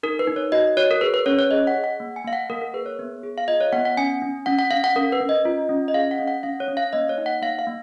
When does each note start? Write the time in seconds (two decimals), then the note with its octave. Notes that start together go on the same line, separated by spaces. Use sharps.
0.03 D#4 A#4
0.19 B4
0.27 D#4
0.36 C#5
0.52 F#4 D#5
0.77 F#4 C#5
0.91 A#4
1.01 G#4 B4
1.14 B4
1.26 C#4 C#5
1.39 C#5
1.51 G#4 D#5
1.67 F#5
1.75 G#4
1.84 F#5
2.00 A#3
2.16 G#5
2.25 A#3 F5
2.33 F#5
2.50 A#3 A#4
2.62 A#4
2.74 G#4 B4
2.86 C#5
2.99 B3
3.23 G#4
3.38 F5
3.48 F4 D#5
3.60 C#5
3.73 B3 F#5
3.85 F#5
3.97 C#4 G#5
4.22 C#4
4.46 C#4 F#5
4.59 F#5
4.71 C#4 F5
4.84 F#5
4.96 C#4 A#4
5.12 B4
5.21 C#4
5.29 D#5
5.45 F4
5.69 C#4
5.88 D#5
5.94 G#4 F5
6.11 F#5
6.19 C#4
6.28 F#5
6.43 C#4 F5
6.60 C#5
6.68 C#4
6.77 F5
6.93 A#3 D#5
7.09 C#5
7.18 D#4
7.26 F#5
7.42 A#3 F5
7.59 F5
7.67 A#3